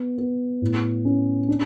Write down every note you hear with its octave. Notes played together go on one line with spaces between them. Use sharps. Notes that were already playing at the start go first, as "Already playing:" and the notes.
Already playing: B3
B3
A2
C#4
D4